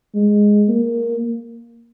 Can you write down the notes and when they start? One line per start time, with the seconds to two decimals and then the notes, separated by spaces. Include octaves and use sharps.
0.15 G#3
0.69 A#3